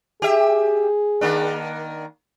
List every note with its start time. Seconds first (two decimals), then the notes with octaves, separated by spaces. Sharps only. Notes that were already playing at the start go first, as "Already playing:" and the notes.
0.22 G4 G#4 E5
1.21 D#3 A#3 D4